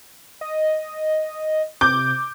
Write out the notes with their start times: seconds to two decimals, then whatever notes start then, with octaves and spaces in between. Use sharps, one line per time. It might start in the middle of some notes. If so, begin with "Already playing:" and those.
0.41 D#5
1.81 C3 D6 G6